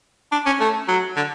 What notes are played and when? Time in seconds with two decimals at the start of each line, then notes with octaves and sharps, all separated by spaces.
0.32 D4
0.46 C#4
0.60 A3
0.88 F#3
1.17 D3